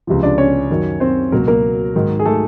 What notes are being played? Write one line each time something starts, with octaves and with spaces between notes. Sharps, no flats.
C#2 C3 F3
D4 D5
C#4 C#5
F#2 D#3 F#3
C4 C5
C#2 B2 F#3 A#3 A#4
A#3 A#4
G#2 D#3 F#3
G#4
A3 A4